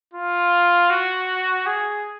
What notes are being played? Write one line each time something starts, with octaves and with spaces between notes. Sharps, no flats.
F4
F#4
G#4